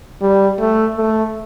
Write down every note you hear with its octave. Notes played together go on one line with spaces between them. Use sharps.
G3
A3
A3